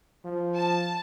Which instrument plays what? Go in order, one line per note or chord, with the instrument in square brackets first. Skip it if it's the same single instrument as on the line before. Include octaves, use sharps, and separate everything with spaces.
[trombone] F3
[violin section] A5